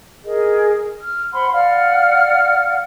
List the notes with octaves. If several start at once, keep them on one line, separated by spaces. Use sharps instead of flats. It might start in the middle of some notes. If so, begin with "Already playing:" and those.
G#4 A#4 D#5
F6
C5 F#5 B5 C6
D5 F5 F#5 F6